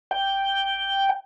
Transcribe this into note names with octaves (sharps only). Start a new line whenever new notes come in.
G5